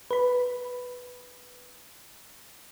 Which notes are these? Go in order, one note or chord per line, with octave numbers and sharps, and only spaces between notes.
B4 B5